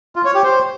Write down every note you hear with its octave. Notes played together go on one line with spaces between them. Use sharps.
F4
C#5
G4
C5